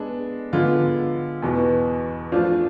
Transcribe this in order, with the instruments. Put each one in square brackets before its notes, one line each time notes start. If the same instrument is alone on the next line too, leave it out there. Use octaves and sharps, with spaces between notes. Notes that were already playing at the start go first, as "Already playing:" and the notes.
Already playing: [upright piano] G#3 B3 D4 A4
D3 G#3 B3 F4
E2 B2 B3
F3 A3 D4 F4